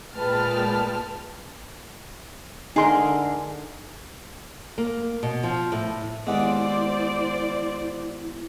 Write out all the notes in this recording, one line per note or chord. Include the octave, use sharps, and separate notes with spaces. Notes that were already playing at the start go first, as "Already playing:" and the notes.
A#2 G#3 B4 G5 A5 F6
D3 D#4 G#4 A#4 C6
A#3
B2
F3
A2
D#2 G#3 B3 E4 C5 D5 F#5